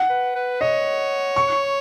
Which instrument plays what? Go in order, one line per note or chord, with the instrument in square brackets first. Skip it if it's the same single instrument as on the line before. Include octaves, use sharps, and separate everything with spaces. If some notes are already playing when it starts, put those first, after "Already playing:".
Already playing: [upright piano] F#5
[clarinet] B4
B4
[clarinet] C#5 [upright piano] D#5
[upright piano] C#6